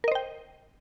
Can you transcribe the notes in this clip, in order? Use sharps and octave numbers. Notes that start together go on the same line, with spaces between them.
A#4 C5 D#5 G5